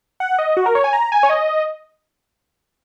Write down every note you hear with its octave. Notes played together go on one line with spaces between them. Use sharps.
F#5
D#5
F#4
A#4
C#5
G#5
A#5
G#5
C#5
D#5